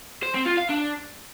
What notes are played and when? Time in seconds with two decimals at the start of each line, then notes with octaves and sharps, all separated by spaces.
0.23 C5
0.35 C4
0.46 F4
0.58 F5
0.70 D4